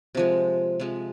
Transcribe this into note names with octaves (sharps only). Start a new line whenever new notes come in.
C3 F3 G#3
C3 F3 G#3